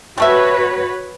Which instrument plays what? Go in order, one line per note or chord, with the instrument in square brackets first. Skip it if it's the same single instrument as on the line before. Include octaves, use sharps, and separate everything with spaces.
[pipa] G3 A3 E5 [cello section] F#4 B4 C#5